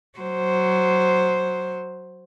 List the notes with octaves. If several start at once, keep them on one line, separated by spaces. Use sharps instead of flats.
F#3 C5